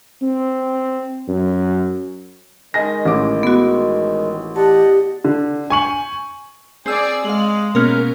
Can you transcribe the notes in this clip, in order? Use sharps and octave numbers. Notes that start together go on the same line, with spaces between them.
C4
F#2
D#3 G#3 D#5 G#5 A#6
A1 D6
B3 F#4
G4 D5 D#5 F#5 A5
D3
G#5 C#6 F#7
C4 G#4 D5 E6
G#3 F5 F#7
B2 A#3 B3 C#4 A#4 F6